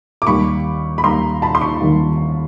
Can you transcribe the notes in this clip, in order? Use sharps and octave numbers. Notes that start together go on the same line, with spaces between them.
D6
D#2 D#3 G3 B5 C#6
B5
D#2 D#3 G3 A#5 C6
A5 B5
C6
B5 C#6
D#2 D#3 G3